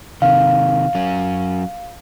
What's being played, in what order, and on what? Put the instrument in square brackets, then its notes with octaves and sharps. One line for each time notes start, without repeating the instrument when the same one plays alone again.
[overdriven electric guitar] C3 D#3 [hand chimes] F5
[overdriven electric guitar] F#3 C#4